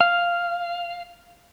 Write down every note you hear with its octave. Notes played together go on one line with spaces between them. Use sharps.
F5